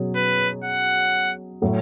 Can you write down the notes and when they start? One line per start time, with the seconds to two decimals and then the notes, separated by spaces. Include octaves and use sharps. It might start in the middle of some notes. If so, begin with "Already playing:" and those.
Already playing: B2 F#3 C#4 G#4
0.15 B4
0.64 F#5
1.62 A2 F#3 A3 E4